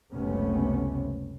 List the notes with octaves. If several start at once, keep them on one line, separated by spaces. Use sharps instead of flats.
F#1 C#2 C3 A3 B3 C#4